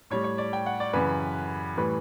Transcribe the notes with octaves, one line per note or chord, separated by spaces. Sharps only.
A2 G3 C#5
C#5
D5
G5
F#5
D5
F#2 C#3 E3 B4
A2 E3 G3 B4